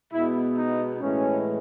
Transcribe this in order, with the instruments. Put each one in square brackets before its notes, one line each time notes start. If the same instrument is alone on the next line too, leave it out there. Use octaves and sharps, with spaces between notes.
[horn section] B2 G#3 B3 E4
D#4
A2 E3 G#3 C#4